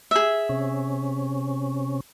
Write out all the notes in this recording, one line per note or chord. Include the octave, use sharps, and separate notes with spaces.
G#4 E5
C3 C#4